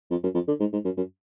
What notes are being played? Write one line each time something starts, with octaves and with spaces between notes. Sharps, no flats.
F2
F#2
F2
D3
G#2
G#2
F#2
F#2